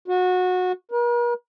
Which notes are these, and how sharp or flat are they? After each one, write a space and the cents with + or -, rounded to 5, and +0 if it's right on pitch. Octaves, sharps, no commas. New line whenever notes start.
F#4 -20
A#4 +45